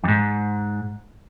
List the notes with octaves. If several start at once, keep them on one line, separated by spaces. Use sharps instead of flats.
F2 G#2